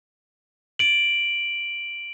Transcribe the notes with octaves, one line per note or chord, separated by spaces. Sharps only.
D7 F#7